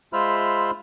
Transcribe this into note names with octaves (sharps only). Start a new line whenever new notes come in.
G#3 F4 C5 E5 B5 F6